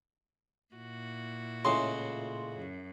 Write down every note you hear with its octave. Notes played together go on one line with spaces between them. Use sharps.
A#2 E4 F#4
C#2 A2 C#3 C6
F#2